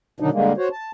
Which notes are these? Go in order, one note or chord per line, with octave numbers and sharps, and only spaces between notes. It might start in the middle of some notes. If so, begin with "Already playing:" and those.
B2 D3 D#3 F#3 D4 D#4
D3 G3 G#3 A#3
F#4 C5 C#5
A5